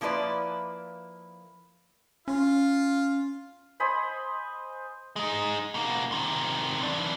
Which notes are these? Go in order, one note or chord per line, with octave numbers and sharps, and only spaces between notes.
F3 A#3 E4 B4 D5
C#4 F4
C5 D#5 G#5 B5
G#3 D#4
B2 A#3
C3 D#3
E3 D4